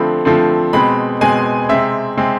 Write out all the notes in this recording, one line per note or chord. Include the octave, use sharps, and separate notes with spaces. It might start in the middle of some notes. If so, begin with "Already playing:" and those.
Already playing: D3 F3 A3 C4 B5
D3 F3 A3 C4
B2 G#3 C4 B5
B2 G#3 C4 G#5
C3 G#3 C4 E5
C3 G#3 C4